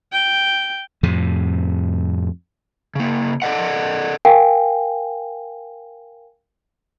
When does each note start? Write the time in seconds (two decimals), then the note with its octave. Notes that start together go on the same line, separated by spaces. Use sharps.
0.12 G5
1.03 F2 A2 C3
2.95 C#3 A#3
3.42 A4 D5 D#5 F#5
4.25 A#4 F5 G5 G#5